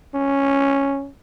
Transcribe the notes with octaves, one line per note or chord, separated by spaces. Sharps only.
C#4